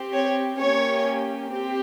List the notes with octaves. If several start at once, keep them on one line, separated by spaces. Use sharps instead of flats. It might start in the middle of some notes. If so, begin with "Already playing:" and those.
Already playing: C4 G4
C#5
A#3 C#4 G4 C#5
C4 G4